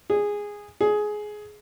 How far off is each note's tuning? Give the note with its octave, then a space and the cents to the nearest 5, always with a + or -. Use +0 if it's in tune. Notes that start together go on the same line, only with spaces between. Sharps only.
G#4 -10
G#4 +15